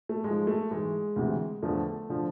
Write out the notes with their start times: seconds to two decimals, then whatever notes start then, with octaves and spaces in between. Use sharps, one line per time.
0.09 A3
0.24 G#2 F3 G#3
0.47 A3
0.71 G#2 E3 G#3
1.16 D2 C3 E3
1.63 E2 D3 F3 A3
2.09 D3 F3